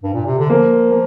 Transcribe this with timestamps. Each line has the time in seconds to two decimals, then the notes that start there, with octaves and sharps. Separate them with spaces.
0.04 G2
0.14 A#2
0.26 C3
0.38 D3
0.50 F3 A#3
0.91 A#3